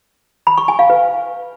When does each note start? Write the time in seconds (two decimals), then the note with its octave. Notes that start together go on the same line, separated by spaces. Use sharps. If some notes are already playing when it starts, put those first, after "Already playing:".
0.47 B5
0.57 C#6
0.68 G#5
0.79 F5
0.90 B4